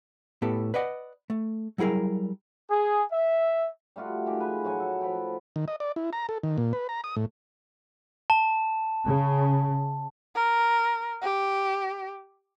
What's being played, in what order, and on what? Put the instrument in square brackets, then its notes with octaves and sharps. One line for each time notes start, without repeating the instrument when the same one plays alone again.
[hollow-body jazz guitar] A2 B3 G4 A4
B4 D5 D#5 F#5
A3
F#3 G3 E4 G#4 A#4
[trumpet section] G#4
E5
[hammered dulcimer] G3 A3 F4 F#4
D#3 G#3 G4
G#4 B4 G#5
A2 F#3 F#4 G#5
A4
F3 B4 C#5 G5
[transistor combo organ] D#3
D#5
D5
E4
A#5
A4
D#3
A#2
B4
A#5
D#6
A2
[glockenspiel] A5
[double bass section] C#3
[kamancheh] A#4
G4